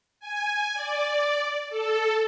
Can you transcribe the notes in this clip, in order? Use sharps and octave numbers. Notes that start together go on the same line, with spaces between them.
G#5
D5
A4